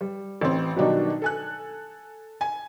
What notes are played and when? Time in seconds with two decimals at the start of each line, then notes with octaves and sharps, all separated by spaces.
0.01 G3
0.41 A1 C4
0.76 B2 D#3 F#3 G3 D4 D#4
1.22 A4 G#5 F#6
2.41 G#5